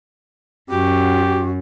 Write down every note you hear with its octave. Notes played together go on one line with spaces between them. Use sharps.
F#2 F#4 G4